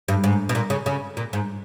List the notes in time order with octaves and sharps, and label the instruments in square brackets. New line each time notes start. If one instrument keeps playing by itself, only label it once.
[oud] G2
G#2
B2
A#2
C#3
C#3
A#2
G#2